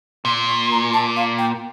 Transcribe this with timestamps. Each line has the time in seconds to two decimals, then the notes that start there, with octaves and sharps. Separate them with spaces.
0.25 A#2 C6
0.49 C#6
0.71 A#5
0.93 A5
1.16 F5
1.38 G5